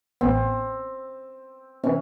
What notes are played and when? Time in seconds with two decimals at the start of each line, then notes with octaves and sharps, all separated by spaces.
0.21 A1 B3 C4
1.84 C3 E3 C#4